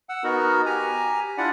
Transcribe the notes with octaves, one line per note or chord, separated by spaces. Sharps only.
F#5 E6
B3 D#4 F#4 A#4
G4 G#5 A#5
D4 E4 F4 D5 F#5